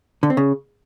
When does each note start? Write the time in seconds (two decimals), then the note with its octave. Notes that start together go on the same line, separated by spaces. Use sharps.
0.23 D3
0.30 C4
0.37 C#3